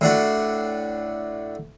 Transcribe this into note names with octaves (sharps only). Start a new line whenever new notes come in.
A2 D4 F#4